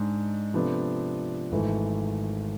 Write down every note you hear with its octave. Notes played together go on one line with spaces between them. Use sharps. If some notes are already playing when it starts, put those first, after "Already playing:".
Already playing: G#2 G#3 D4
C3 F3 B3 D4 A4
G#1 G#2 E3 A3